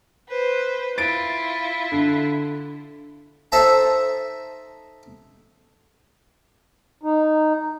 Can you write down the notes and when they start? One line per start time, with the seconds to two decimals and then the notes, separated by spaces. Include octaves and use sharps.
0.29 B4 C5
0.98 E4 F4 A6 D7
1.92 D3
3.52 D#4 A4 C5 E5 A5 A#5
7.03 D#4